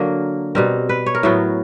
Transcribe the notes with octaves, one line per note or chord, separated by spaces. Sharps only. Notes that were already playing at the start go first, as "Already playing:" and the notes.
Already playing: D3 F#3 A#3 A#4
B2 G3 C4 A#4
B4
C#5
A#4
A2 F#3 B3